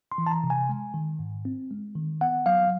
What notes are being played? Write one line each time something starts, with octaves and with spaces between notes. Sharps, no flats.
C6
E3
A5
A#5
C3
G#5
G#3
D#3
G#2
C4
G#3
D#3
B3 F#5
F#3 F5